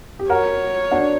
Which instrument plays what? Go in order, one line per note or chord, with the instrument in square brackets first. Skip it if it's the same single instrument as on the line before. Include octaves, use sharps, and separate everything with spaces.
[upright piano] G4
[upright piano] F#4 A#4 [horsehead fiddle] C#5
[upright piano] D4 F#4